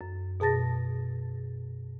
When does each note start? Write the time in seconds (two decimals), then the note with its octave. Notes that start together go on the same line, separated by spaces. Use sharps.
0.01 F#2
0.40 B2 G#4 A5 A6 A#6